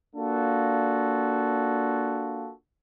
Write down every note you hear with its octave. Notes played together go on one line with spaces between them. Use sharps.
A#3 D4 F4 F#4 A4